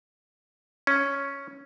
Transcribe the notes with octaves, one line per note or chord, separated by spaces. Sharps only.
C#4